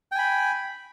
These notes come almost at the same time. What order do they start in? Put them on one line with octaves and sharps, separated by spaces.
G5 G#5 B5